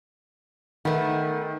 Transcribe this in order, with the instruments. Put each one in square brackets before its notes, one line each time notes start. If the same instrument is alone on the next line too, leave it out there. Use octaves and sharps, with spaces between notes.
[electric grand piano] D#3 [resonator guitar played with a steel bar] A3 B3